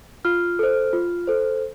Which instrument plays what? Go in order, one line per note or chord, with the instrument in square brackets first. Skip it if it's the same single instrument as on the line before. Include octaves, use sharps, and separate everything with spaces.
[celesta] F4 F6
A4 C5
F4
A4 C5